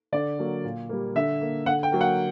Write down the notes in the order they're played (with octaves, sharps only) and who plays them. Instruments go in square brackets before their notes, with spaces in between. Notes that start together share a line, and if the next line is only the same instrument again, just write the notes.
[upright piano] D3 D5
F#3 A#3
A#2
G3 A#3
D3 E5
A#3
D3 F#5
G5
F#3 A#3
F#5